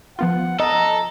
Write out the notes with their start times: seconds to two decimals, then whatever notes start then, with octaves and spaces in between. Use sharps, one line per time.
0.19 F3 B3 F4 F#5
0.60 A4 D#5 A#5